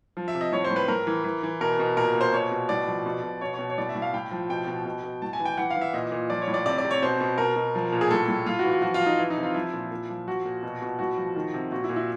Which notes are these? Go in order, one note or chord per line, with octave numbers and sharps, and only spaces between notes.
F3
E5
C3
D#5
A2 C#5
C5
A2
B4
A2 A#4
E3
E3
E3
B2 A#4
B2
A#2 A#4
A#2
C5
B2 C#5
B2
A2 D5
F3
B2
B2
B2 C#5
B2 C#5
C#5
A2 D5
E5
A2
F5
A2 G5
F3
B2 G5
B2
B2
B2
A2 A5
G#5
E3
G5
E3 F#5
F5
E3
E5
A#2 D#5
A#2
F3 D5
C#5
A2
D5
C3 D5
D5
C3
C#5
B2 C5
B2
B2 A#4
B2
F3
A#2
G#4
A2 A4
A2
A2 F4
F#4
E3
F#4
F3 F#4
F4
F3
D#4
E3 E4
D#4
C3
F4
F3 E4
A#2
A#2
F3
F3 F#4
A#2
B2
B2
A2 F#4
F3
D#3
C3
A#2 F#4
E4
A#2
E4